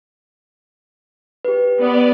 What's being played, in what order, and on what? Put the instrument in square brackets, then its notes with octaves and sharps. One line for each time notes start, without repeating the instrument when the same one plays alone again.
[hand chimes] G4 B4
[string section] B3 [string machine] D5